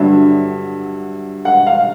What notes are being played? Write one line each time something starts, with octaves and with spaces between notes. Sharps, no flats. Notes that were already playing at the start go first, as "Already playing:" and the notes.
Already playing: G2 D3 F#3 E5
F#5
F5